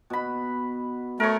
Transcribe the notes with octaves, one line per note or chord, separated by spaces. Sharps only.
B2 B5
A3 A#4 C#5